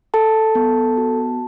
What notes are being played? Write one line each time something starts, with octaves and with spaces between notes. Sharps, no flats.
A4 A5
B3
F#4